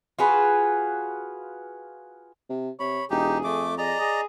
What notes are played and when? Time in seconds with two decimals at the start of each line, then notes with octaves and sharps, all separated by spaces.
0.19 F4 F#4 G#4 B4
2.49 C3
2.80 C3 C#5 B5
3.10 E1 D#4 G4 G#4
3.44 F2 A3 D6
3.78 G#4 D5 D#5 A#5
4.00 G#4